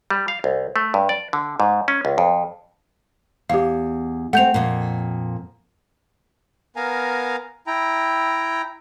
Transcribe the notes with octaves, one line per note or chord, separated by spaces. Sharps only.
G3
F5
C2
A3
G2
D5
D3
G#2
C#4
C#2
F2
E2 G4 F5
A3 C4 F#5 G6 F7
F2 A#2
B3 A#4 F5 G#5 A#5
E4 G5 A#5